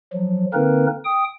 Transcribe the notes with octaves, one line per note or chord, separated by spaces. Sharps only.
F3 F#3
D3 A#3 C4 D#4 A#4 B4
G5 D#6